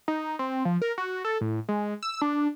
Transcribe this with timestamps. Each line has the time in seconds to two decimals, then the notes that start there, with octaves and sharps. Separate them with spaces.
0.08 D#4
0.39 C4
0.65 F3
0.82 A#4
0.98 F#4
1.25 A4
1.41 A2
1.69 G#3
2.03 E6
2.22 D4